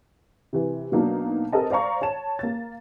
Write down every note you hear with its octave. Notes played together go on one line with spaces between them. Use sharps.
C3 E3
B2 F#3 A#3 D4 D#4
C4 G4 A4 A#4 D#5 A5
C5 D5 F5 A#5 C#6
C#5 A5 E7
A#3 A6